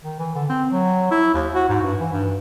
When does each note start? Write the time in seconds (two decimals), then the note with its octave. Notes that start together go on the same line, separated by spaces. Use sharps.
0.04 D#3
0.19 E3
0.35 D3
0.49 C4
0.71 F#3
1.11 E4
1.34 D#2
1.54 F#4
1.69 G#2
1.83 G2
2.00 E3
2.13 G2